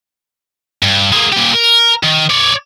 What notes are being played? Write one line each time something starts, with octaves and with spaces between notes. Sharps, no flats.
G2
G#3 A#3
A#2 G4
A#4
D#3
C#5 D5